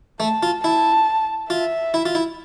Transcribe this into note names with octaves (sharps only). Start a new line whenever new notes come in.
A3 A5
F4
E4 A5
F4 E5
E4
F4
E4